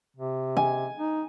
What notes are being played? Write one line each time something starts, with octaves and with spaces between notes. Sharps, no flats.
C3
G#5
D#4